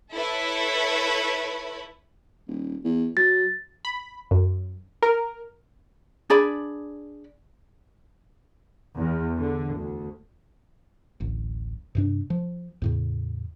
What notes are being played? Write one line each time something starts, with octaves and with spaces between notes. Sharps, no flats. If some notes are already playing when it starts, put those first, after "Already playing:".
E4 A4 B4 C#5 E5
D#1
E2
F#3 A6
B5
F#2
A#4
D4 G#4 D5 B5
E2
D3
D2
D1 A1
G2 C3 D4
F3
E2 A2 C#3